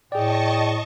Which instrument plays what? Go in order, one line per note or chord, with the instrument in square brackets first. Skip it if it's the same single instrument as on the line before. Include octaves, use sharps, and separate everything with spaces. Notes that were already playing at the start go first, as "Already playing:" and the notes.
[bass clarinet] A2 [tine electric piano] G#4 D5 [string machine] D#5 A5 C#6 [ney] G5